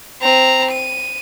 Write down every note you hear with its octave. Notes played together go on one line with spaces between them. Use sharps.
C4 A#5
D#7